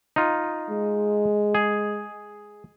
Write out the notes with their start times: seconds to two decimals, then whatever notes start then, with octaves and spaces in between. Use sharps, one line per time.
0.16 D#4 F4
0.70 G#3
1.55 G#4